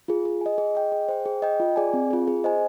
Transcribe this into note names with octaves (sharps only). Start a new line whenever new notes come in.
F4 G#4
G#4
D#5 G#5
G#4
D#5 G5
G#4
C5 G5
G#4
D#5 G5
F4
G#4 D5 G#5
C4
F4 G#4
G#4
C5 D#5 G#5